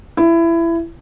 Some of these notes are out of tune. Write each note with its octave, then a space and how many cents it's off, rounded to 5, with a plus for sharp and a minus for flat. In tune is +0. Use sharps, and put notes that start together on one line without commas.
E4 +20